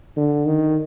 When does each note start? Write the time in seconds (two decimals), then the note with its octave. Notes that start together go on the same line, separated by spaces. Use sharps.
0.17 D3
0.46 D#3